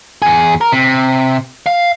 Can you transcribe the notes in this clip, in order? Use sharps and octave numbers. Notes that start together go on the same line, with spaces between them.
E2 G#4
A#4
C3
F5